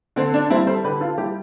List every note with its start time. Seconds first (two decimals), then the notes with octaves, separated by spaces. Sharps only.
0.16 D3 C4
0.34 D4
0.50 G3 C4 E4
0.67 A4 C5
0.84 D3 G4 B4
1.01 F4 A4
1.18 G3 E4 G4